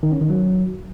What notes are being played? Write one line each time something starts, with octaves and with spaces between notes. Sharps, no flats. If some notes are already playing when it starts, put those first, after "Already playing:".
D#3
C#4
D#3
F#3